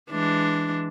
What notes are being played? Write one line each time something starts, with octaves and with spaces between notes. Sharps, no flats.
E3 G#3 D4